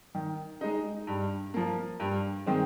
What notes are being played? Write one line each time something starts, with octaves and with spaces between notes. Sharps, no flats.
D#3
G#3 D#4
G2
F3 A#3
G2
D#3 G#3 C4